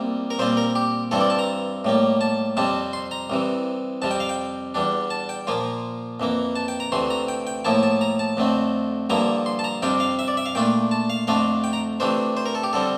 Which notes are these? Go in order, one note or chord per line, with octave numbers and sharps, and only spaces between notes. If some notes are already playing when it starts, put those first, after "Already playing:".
Already playing: C2 C3 G3 A#3
A#4
A#2 G3 C4 F4 C5
A#4
G4
G2 E3 G3 C4 E4 A4
D5
A5
A#5
A2 G3 A#3
A5
F2 C3 G3 C4 A5
C6
A#5
C2 C3 E3
F2 C3 G3 A5
G5
F5
G5
E2 E3 G3 D4
A5
G5
A#2 F3 A#3 F4
F2 E3 A#3
A5
G5
A#5
D2 C3 E3 A3 C6
A#5
G5
G5
A2 F3 A#3 E4 A5
A5
A#5
A5
F2 D3 A3 C4
G2 D3 F3 A#3 E4 A#5
C6
A5
A#5
F2 C3 G3 D4 F4 G5
F5
E5
D5
E5
F5
A#2 A3 D4 F4 G5
A5
F5
F2 D3 A3 D4 F4 F5
G5
A#5
C3 E3 A3 D4 C5
C5
A#4
A4
G4
D3 G3 C4 A4